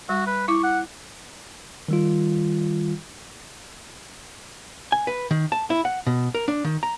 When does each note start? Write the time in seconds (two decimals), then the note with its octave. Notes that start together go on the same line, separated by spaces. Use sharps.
0.09 G3 F#4
0.27 B4
0.48 E4 C#6 D6
0.64 F#5
1.88 D#3 G3 F4
4.92 G#5
5.07 B4
5.31 D#3
5.52 A5
5.70 E4
5.85 F#5
6.07 B2
6.35 A#4
6.48 D4
6.64 D#3
6.83 A#5